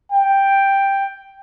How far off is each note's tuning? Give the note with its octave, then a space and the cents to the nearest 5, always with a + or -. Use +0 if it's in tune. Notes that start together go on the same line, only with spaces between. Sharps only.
G5 +5